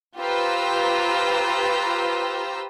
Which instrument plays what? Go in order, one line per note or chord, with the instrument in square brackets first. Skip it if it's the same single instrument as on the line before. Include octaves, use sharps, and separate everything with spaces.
[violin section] F4 G4 B4 C5 A#5 E6